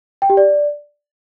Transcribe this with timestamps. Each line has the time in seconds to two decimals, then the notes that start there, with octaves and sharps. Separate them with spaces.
0.22 G5
0.30 G4
0.37 D5